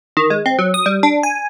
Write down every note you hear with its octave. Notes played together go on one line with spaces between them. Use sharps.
D#3
G#3
C4
F#3
D#6
G3
D4
G#5